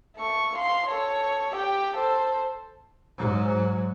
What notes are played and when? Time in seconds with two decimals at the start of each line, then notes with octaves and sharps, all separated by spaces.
0.16 A3 C#6
0.56 F5 C6
0.88 A4 C#5
1.54 G4 G5
1.97 A4 C5
3.18 G#2 F#3